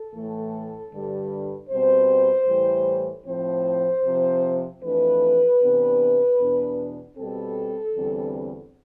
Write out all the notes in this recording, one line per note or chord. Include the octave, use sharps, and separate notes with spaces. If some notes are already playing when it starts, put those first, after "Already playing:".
Already playing: A4
A2 E3 A3
G2 D3 G3
B2 G3 C4 C5
A2 E3 G3
A2 F3 C4 C5
C3 F3 C4
F2 E3 A3 D4 B4
C3 E3 B3 D4
E2 B2 B3 D4
B2 G3 C4 A4
E2 D3 G3 C4